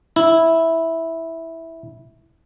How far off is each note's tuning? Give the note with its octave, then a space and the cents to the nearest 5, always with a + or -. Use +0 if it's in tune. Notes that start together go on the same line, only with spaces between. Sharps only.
E4 -10